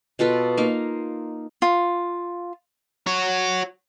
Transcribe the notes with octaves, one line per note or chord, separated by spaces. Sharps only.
B2 F4 A4 B4
A#3 D#4 F5
F4
F#4 C#5